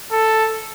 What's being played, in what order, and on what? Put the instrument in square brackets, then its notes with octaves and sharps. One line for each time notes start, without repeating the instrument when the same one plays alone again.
[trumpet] A4